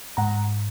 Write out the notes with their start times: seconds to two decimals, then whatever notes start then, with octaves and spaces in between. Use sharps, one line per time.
0.17 G#2 F#5 A#5